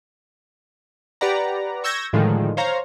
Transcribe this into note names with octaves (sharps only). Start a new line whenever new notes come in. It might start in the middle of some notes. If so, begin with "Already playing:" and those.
G4 B4 D5 F#5 A#5
C#6 E6 G6 G#6 A#6
A2 D3 D#3 F3 G#3
C5 C#5 F5 A#5